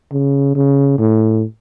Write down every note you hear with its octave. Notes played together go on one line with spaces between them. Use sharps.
C#3
C#3
A2